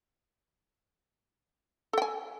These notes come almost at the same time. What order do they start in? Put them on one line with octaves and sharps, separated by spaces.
A4 G5 G#5